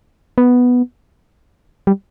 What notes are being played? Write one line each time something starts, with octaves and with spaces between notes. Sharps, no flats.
B3
G3